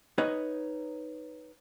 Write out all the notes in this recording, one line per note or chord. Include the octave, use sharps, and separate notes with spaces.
D#4 B4 C#5 D#5